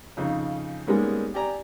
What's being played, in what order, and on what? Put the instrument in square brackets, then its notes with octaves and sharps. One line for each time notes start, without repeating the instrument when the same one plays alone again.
[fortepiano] F2 C#3 D#4
G#2 G3 G#3 A#3 B3 C#4
G4 D5 G#5 A#5